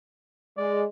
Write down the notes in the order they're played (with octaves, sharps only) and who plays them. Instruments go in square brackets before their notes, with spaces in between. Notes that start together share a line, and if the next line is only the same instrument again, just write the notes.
[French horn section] G#3 [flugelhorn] D5